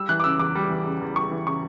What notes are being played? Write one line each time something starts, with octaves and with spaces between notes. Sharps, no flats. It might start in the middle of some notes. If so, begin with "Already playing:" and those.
Already playing: G3 E6
E3 F#6
D6
C#3 E6
E2 D6
G3
E3
C#3
E2
G3 C#6
E3
C#3 C#6